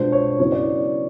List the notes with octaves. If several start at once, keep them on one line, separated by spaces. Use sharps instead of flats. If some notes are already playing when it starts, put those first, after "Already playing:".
Already playing: B2 G#3 B3 D4 F4 C5
C#5
C#3 F#3 B3 E4 C#5
D5